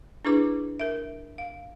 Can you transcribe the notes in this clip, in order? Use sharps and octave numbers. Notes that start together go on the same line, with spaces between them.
D4 E4 G#4 B4 D6
A#4 E5
F5